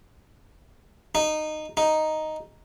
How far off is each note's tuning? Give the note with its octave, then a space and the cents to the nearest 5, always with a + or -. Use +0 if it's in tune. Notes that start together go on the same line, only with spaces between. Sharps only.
D#4 -15
D#4 +0